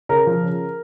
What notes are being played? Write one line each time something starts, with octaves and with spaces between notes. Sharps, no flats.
C#3 A#4 A#5
F3
C#3